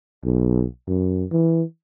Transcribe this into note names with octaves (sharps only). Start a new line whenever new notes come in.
B1
F#2
E3